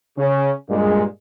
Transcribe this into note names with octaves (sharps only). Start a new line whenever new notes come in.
C#3 C#4
G2 A#2 G#3